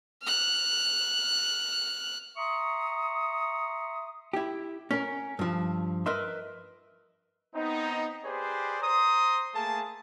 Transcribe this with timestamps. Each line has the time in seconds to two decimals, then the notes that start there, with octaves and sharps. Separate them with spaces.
0.22 F6 F#6
2.37 E5 A#5 C6 C#6 D#6
4.33 E4 G4
4.91 C#4 A#4
5.39 G2 F3
6.06 A#4 B4 D#5 E5 C6
7.54 B3 C4 D#4
8.25 G4 G#4 B4 C5 D5
8.82 C5 A#5 C6 D#6
9.53 A3 A#3 G#4 A5